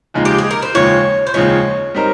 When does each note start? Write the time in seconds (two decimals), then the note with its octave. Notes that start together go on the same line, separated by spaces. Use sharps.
0.14 D#2 C#3 F3 G#3 D#4
0.25 G4
0.38 G#4
0.51 A#4
0.62 C5
0.74 D#2 C#3 F3 G#3 C#5
1.27 C5
1.34 D#2 C#3 F3 G#3 C#5
1.95 G3 C4 D#4 A#4